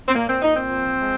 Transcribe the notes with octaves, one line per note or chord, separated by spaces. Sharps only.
C4
A#2 A#3
C4
A#2 D#4
C4
F3
G#3